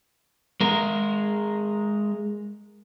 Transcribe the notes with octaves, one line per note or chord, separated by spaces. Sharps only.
G#3 A#4